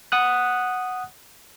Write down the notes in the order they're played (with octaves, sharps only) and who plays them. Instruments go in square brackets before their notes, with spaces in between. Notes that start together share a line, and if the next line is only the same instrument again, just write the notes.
[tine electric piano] F#5 D#6 F#6